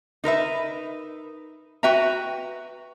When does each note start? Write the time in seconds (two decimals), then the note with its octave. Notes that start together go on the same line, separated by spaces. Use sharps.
0.24 D#4 A#4 B4 E5
1.83 F#4 B4 E5 G5 A#5